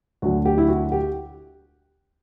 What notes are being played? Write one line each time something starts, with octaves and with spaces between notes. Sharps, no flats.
D2 D3 F#3 F#4
G4
E4
F#4
G4